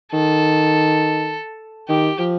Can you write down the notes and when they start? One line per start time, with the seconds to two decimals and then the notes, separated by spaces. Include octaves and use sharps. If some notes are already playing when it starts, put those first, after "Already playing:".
0.12 D#3 A4
1.88 D#3 G4
2.19 F3